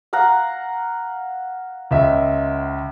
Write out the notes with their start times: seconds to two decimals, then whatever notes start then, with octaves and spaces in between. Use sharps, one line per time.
0.13 F5 F#5 A#5
1.91 C#2 E5